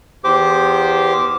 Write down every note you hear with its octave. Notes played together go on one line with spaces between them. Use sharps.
E2 G4 C5 D6